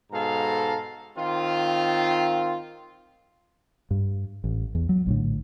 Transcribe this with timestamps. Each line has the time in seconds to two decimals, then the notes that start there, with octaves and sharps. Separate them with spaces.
0.12 G#2 B2 A4 F5 A#5
1.18 D#3 C4 F4
3.91 G2
4.44 A1
4.75 E2
4.89 F#3
5.06 A#1 A2 D3